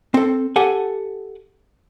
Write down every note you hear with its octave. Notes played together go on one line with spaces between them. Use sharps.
C4 A4
G4 A4 F#5 G#5